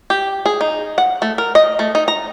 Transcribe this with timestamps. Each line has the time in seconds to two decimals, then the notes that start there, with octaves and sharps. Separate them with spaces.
0.10 G4
0.46 G#4
0.61 D#4
0.98 F#5
1.22 A3
1.38 A#4
1.55 D#5
1.79 A3
1.95 D#4
2.08 A#5